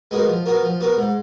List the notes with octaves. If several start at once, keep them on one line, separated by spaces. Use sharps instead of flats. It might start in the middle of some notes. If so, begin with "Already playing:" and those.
G#3 B3 F#4 A#4
F3
B3 F#4 A#4
F3
B3 F#4 A#4
G#2